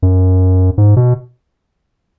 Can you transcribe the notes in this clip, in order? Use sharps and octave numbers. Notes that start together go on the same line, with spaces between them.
F#2
G#2
B2